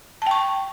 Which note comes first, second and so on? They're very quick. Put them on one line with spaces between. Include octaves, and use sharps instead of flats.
A5 G5 C#6